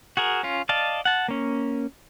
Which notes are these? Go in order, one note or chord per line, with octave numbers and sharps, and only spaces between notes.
F#4 G#4 A#4
C#4 F4
D5 D#5 F5 A5
F#5 A5
A#3 C#4